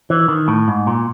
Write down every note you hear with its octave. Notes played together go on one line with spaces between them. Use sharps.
E3
D#3
A2
G#2
A#2